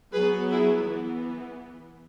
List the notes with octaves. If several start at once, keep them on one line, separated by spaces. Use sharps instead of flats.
F#3 B3 G#4 B4
E4 G#4
E3 B3